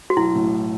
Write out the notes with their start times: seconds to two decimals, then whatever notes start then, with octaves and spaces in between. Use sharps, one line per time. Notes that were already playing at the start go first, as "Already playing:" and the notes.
0.10 F#4
0.17 B1 E4
0.35 A2